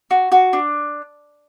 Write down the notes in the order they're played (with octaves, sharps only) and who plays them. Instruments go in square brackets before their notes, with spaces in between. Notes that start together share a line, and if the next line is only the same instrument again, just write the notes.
[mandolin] F#4
F#4
D4